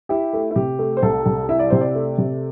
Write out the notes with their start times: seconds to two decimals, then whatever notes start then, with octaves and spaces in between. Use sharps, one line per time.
0.09 E4 G4
0.33 A3
0.51 E4
0.56 C3 G4
0.79 A3
0.97 C5
1.03 C2 A4
1.26 C2
1.49 E4 E5
1.59 D5
1.70 C3 C5
1.81 D5
1.95 A3
2.18 C3